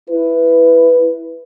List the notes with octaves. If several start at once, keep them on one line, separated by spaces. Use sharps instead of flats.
E4 B4